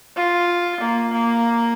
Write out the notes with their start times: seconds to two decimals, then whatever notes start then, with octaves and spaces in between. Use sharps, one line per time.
0.17 F4
0.81 A#3
1.13 A#3